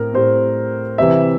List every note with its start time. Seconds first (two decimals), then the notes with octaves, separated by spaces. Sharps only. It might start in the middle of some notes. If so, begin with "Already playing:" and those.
Already playing: A2 C4 A#4
0.14 A2 G3 C4 C5
0.98 C3 E3 G3 C4 E5